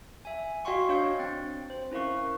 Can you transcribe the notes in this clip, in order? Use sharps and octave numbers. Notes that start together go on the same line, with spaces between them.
E5 G#5
F#4 D#5 F5 G5 C6 C#6
D4 C#5 F5 G6 C#7
C4 G5
C5
C#4 E4 A#4 F5 C#6